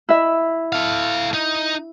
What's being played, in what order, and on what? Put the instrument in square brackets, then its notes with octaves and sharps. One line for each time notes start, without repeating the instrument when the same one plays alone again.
[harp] E4 E5
[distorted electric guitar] A4 F5
D#4